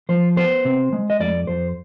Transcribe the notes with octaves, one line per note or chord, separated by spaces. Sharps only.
F3 C5
B3 C5
C3
G#3
D#5
F2 D5
F2 C5